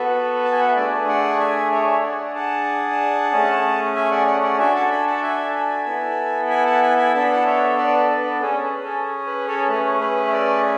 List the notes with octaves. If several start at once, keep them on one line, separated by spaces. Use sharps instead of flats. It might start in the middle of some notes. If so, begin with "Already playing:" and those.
Already playing: B3 F#4 A4 B4
A5
G#5
F#5
E5
A3 D4 G#4 B4 D5
D5 F#5
E5 G#5
C#5 E5
D4 G#4 D5 F#5
F#5 A5
A3 C#4 G#4
E5 G#5
D5 F#5
D5 F#5
D5 F#5
D4 F#4 A4 E5 G#5
F#5 A5
G#5 B5
F#5 A5
E5 G#5
A5
G#5 B5
B3 E4 A4
G#5 B5
F#5 A5
G#5 B5
G#5 B5
B3 D4 A4 A5
B5
F#5 A5
C#5 E5
B4 D5
B4
C#4 G#4 A4
B4
A4
B4
A4 C#5
A3 C#4 G#4 B4
B4
E5
B4 D5